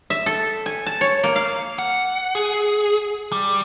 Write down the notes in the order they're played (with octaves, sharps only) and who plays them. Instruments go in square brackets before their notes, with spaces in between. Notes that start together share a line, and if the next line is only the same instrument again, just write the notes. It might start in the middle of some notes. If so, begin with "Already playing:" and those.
[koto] E5
A4
G#5
A5
C#5
A#3
F5
[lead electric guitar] F#5
G#4
G3